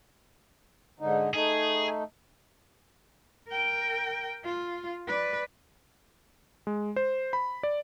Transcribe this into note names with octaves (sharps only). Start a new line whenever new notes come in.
G#2 D3 D#4
A3 D#4 G#4
A#4 G5
F4
B4 D5
G#3
C5
B5
D5